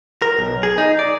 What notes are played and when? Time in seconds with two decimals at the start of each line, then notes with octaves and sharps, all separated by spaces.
0.22 A#4
0.39 B1
0.63 G#4
0.78 D#4
0.99 D5